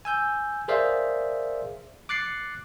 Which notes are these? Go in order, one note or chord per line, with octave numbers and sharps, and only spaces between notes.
G#5 E6 G6
G#4 A#4 C5 D5 E5 F5
D6 F#6 A6 C7 C#7